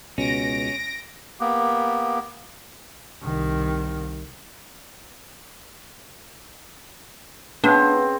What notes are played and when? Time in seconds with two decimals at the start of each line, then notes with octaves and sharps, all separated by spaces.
0.18 C#2 B2 C#4 A#6 D7
1.40 A#3 B3 G4
3.23 C2 D#3
7.64 C#3 B3 C4 D4